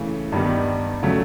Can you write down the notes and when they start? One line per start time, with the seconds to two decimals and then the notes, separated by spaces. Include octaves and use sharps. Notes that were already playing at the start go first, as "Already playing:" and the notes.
Already playing: C#3 E3 A3
0.32 G2 D#3 G3 B3 D#4
1.03 C#3 F#3 A3